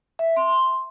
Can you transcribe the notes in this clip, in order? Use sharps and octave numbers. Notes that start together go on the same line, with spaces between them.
E5
C6